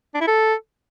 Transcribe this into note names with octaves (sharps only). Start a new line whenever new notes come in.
D4
E4
A4